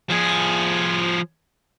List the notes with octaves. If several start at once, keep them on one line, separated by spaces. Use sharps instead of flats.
F3 G#4